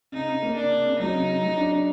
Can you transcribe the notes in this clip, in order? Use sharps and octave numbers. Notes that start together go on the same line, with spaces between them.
C#3 D#4
C#3
A#3
C#3 D4
C#3
C#3
F#3 D#4
C#3
C#3
F#3
D4
D4